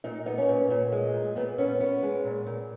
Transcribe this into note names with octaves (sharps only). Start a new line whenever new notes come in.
A#2 D#4
B3 D#4
C#4
A#2
A#2
G#3
A#2
A#2 B3
B3 C#4
B3 C#4
G#3
A#2
A#2